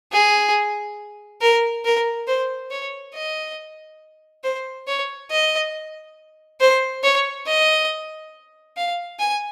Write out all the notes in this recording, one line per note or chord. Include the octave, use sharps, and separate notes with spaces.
G#4
A#4
A#4
C5
C#5
D#5
C5
C#5
D#5
C5
C#5
D#5
F5
G#5